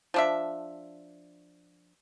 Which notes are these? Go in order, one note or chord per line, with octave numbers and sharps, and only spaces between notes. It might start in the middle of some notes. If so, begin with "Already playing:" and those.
F3 D4 E5